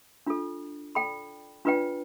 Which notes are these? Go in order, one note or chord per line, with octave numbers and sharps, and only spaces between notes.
D4 F4 A4
A4 D5 G5 B5
D4 F4 B4 D5 G5